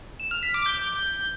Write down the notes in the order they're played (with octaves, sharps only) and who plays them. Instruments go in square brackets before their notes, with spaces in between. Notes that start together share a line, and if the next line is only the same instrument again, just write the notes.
[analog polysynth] E7
F6
B6
D6
G6